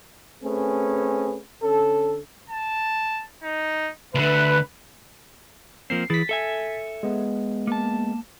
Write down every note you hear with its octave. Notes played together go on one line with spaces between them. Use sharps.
A3 C4 C#4 G#4 B4
D3 C#4 A4
A5
D#4
D2 D3 B4 E5
F3 A#3 C4 C7
E3 E4 G#4 A6 B6
A4 E5 G#5
G#3 B3
A#3 A5